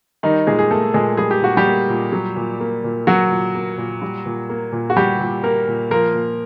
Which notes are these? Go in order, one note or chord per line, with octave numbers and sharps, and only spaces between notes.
D#3 G3 D#4
A#2 G#3 G#4
G#4
A3 A#3 A4
A#2 G#3 G#4
G3 G#4
G4
A#2 F#4
G3 G4
A#3
A#2
F#3
A#2
A#3
A#2
F#3 F#4
A#2
A#3
A#2
G3
A#2
A#3
A#2
F#4
G3 G4
A#2
A#3 A#4
A#2
F3 A#3 A#4
A#2